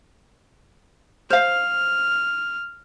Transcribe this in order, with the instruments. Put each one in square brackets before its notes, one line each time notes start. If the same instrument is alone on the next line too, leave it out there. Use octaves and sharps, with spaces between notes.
[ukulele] C5 F5 [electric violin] F6